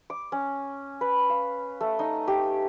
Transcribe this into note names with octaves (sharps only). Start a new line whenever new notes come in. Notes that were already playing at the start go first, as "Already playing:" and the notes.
D6
C#4
B4
F5
A3
D#4
G4